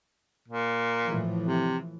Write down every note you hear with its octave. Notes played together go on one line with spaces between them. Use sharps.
A#2
A2 E3 F3
C3